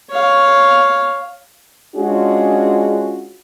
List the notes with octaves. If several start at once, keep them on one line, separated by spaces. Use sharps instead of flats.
C#5 F5
G#3 C#4 D4 F4 F#4 G#4